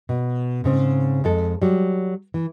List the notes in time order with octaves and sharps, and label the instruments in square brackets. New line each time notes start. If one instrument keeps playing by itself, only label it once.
[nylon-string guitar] B2
G#2 C#3 C4
F2 G#3 A4
F#3 G3
E3